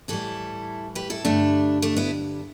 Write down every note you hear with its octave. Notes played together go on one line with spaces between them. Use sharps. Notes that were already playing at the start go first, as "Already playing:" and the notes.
A2 E3 G3 E4 A4
G4 B4
E4 A4
G2 D3 G3 A3 D4
A3 D4
B3 E4